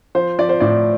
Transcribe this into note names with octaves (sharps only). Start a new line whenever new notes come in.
F3 C5
F3 D5
C5
A2 D5